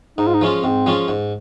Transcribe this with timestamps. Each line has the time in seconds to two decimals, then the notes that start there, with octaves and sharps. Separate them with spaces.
0.18 G#2 D#4
0.27 F4
0.34 D#4
0.41 F3 G#3 C#4 F4
0.64 G#2 C4
0.86 F3 G#3 C#4 F4
1.08 G#2